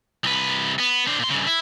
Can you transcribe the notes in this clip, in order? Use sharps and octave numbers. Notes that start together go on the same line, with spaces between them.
C2 B4
B3
D4 C5
A#2 C6
G2 C#3
E4